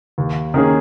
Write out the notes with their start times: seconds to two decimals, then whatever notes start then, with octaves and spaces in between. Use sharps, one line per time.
0.18 D#2
0.54 D#3 A#3 C#4 G#4